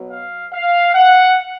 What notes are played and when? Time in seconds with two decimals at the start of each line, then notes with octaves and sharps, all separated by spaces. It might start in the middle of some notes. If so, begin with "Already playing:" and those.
Already playing: B2 F#3 B3
0.10 F5
0.53 F5
0.95 F#5